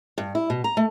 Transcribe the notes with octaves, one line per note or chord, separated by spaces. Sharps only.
G2
E4
B2
A#5
A3